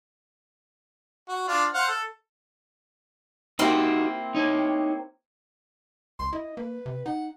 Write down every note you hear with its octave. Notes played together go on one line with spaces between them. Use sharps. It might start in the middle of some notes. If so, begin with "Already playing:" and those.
F#4
D4 F4
C5 F5 F#5
A4
A#3 C4 D#4 E4 F#4 G4
D#4 C#5
C#2 C6
E4 D#5
A#3 B4
C3
D#4 F#5